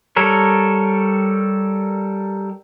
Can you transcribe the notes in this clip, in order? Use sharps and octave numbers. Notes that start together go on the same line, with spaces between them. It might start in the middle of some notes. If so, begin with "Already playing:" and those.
G3 A4 A#4 C#5